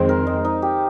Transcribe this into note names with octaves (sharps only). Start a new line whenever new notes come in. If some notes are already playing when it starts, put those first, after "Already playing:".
Already playing: F2 D#3 G#3 C4 C5
A#4
D#4
D#4
G4